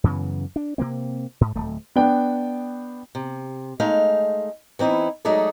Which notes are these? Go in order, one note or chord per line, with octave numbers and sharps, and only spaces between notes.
F#2 C#3 E3 B3
D4
C3 F#3 A#3 C4
G#2
D1 A3
B3 D4 G5
C3
G#3 A3 D#4 F5
E3 C4 D#4 E4
F#3 G#3 A3 D#4 A4 D5